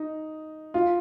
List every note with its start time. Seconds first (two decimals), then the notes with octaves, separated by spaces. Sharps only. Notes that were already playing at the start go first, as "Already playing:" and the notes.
Already playing: D#4
0.74 F4